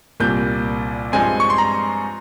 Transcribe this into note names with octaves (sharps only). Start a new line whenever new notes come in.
C2 A#2 G3 A#3 G6
G2 F3 G#3 C4 G#5
C#6
C6
A#5